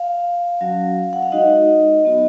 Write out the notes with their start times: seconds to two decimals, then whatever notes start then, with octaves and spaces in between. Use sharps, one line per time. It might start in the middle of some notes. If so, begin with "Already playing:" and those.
Already playing: F5
0.61 F#3 C#4 F#4
1.13 F#5
1.22 F5
1.32 G#3 D#4 F#4 D#5
2.04 F#3 B3 D#4 F#4